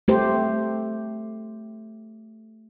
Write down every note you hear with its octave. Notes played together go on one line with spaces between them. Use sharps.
A3 G4 C5